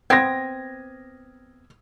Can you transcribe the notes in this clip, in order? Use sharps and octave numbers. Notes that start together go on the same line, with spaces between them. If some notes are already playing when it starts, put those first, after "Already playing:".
B3 C4 G#6 A#6